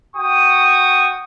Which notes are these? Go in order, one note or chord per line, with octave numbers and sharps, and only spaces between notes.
F#4 G5 C#6 D#6